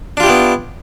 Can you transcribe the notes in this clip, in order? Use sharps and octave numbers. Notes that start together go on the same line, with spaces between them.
B3 D4 E4 F4 G4